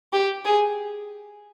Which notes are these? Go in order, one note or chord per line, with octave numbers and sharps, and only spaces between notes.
G4
G#4